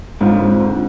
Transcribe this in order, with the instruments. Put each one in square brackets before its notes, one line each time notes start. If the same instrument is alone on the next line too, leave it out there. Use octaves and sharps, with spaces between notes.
[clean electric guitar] F2 D3 F3 [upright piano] G#2